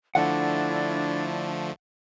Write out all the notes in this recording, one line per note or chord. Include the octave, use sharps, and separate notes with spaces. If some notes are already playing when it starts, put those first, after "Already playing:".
D3 F3 A3 D4 E4 F#5